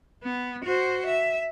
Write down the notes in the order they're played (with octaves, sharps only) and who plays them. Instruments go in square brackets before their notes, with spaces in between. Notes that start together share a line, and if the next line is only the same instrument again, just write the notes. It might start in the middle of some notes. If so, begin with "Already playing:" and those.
[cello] B3
F#4 C5
E5